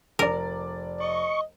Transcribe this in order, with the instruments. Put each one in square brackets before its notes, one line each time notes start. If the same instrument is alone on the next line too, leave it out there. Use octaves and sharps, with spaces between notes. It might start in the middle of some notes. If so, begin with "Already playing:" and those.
[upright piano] F1 D5 [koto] A#4
[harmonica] D#5 [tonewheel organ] C#6